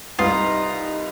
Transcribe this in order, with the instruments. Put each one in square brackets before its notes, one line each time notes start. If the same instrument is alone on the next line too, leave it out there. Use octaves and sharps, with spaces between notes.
[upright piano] C2 B4 D#6 [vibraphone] D#4 G4 D#5 [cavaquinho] F4 [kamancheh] A#5